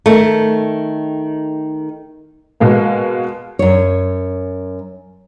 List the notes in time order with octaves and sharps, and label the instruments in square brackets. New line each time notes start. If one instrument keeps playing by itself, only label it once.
[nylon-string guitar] D#3 A3
[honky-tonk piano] B2 G#3 A#3
[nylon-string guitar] F#2 C#5